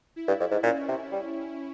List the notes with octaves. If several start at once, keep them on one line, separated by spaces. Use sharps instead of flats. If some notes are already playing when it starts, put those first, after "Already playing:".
E4
G2
F2
G#2
A#2 C#4
C3
G3